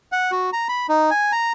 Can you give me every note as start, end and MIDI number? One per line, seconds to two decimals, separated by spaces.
0.12 0.31 78
0.32 0.50 66
0.53 0.67 82
0.69 0.86 83
0.89 1.10 63
1.11 1.32 80
1.32 1.52 82